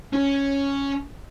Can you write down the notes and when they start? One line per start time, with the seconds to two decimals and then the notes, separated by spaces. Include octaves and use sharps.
0.13 C#4